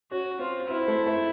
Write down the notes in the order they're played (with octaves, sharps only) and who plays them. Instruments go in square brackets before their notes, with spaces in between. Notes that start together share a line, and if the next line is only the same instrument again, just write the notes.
[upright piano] C#4 C#5 [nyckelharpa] F#4
[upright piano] C4 C5 [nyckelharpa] F4
[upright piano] C4 C5 [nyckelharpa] E4
[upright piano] A3 A4
A3 A4